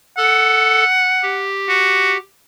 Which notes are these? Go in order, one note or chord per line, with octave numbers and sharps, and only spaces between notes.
A4 F#5
G4
F#4